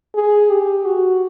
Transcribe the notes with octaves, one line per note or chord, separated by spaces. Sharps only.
G#4
G4
F#4